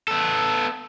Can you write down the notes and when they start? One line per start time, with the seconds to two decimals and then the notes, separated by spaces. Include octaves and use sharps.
0.08 B3 A4